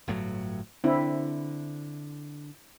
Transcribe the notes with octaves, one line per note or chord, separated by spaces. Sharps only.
G1 A2 F#3
D3 C4 D4 E4